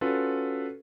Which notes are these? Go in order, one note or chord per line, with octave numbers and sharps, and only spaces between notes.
C#4 F4 F#4 A4 B4